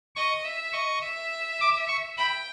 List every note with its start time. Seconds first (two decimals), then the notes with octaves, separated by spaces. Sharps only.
0.16 D#5 C#6
0.45 E5
0.73 D#5 C#6
1.02 E5
1.60 D6
1.88 C#6
2.17 G5 B5